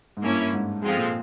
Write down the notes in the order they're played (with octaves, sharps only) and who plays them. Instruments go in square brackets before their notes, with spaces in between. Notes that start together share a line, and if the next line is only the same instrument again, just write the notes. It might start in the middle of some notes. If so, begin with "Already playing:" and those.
[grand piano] G#2
[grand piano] G2 [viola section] A#3 C#4 E4
[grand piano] G#2
[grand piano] G#2 [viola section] F3 G#3 C4 F4 A4
[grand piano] A#2